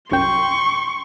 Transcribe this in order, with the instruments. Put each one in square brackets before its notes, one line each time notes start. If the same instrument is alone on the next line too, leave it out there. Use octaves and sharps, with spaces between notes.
[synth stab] C2 F#2 G5 [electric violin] C6 C#6